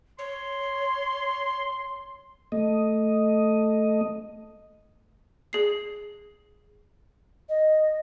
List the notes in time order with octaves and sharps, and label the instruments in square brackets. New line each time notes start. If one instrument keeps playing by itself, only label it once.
[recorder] C#5 [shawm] C6
[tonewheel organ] A3 D#5
[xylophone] G#4 C7
[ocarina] D#5